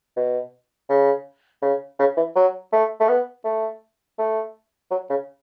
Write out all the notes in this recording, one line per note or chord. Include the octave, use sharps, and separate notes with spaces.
B2
C#3
C#3
C#3
E3
F#3
A3
A3
B3
A3
A3
F#3
C#3